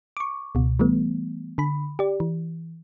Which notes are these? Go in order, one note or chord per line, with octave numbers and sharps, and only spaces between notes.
C#6 D6
C#2 B2
E3 G3 A3 B3
D3 B5
G4 D5
E3